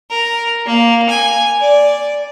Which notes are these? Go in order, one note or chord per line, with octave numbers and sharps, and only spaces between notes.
A#4
A#3
G#5
D5